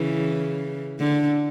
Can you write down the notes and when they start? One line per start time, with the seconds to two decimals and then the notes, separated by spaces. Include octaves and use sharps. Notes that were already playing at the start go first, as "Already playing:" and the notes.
Already playing: C#3 E3
0.99 D3